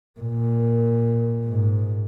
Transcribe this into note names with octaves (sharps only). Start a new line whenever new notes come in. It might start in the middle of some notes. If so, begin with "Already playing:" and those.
A#2
G#2